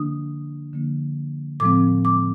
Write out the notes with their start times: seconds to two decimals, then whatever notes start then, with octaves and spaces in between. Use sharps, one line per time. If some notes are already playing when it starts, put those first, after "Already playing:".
Already playing: D3 F3 A#3 D4 D#6
0.74 D3 F3 A#3 D4
1.60 A2 F3 G#3 C4 D6
2.05 D6